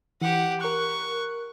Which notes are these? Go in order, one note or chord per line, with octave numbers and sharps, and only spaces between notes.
E3 G4 F#5
A#4 C#6 F#6